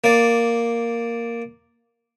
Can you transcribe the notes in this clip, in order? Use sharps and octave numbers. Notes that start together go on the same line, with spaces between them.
A#3 D5